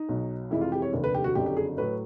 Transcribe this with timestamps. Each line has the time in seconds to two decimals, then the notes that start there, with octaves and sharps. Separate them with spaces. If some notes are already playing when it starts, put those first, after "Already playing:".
Already playing: D#4
0.09 B1 B2 F#3
0.50 F2 C3 E3 G#3 E4
0.61 F4
0.72 G4
0.82 C#5
0.93 F1 D#2 D3
1.04 B4
1.15 G4
1.24 F#4
1.35 F#1 F2 D3 F#3 G4
1.46 G4
1.57 G#4
1.77 A2 F#3 B4